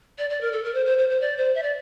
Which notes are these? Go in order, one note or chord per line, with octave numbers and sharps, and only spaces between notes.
D5
D5
A#4
A4
A#4
C5
C5
C5
C5
D5
C5
E5
D5